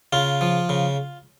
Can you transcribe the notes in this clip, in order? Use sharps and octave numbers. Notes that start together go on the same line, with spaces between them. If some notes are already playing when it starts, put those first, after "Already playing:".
C#3 F4
F3
C#3